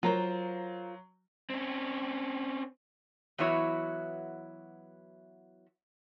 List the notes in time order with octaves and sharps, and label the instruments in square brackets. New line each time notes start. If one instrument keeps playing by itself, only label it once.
[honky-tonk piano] F#3 [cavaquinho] F4 A#4 C5
[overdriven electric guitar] C4 C#4
[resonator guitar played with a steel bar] E3 F#3 B3 E4 F#4 C#5